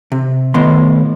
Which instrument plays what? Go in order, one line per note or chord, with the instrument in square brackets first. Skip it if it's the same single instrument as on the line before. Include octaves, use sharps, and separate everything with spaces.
[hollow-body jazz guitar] C3
A2 D#3 B3 C6